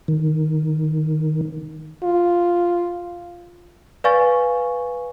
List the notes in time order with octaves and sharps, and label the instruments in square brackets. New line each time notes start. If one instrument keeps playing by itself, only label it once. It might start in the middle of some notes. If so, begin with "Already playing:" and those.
[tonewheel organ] D#3
[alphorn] F4
[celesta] B4 D5 F5 G#5 C#6 A6